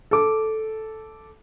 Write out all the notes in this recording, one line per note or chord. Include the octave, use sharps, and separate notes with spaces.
A4 D6